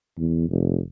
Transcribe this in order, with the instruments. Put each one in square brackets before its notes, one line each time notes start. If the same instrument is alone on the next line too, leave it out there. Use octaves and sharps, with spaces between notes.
[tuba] E2
F1